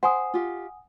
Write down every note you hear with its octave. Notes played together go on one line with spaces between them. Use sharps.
C5 F#5 G#5 D#6
F4 G4